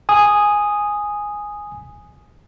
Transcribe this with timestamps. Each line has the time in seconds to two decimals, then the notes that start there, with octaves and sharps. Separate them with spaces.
0.09 G#5 D#6